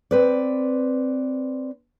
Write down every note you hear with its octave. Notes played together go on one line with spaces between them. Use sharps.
C4 B4 D5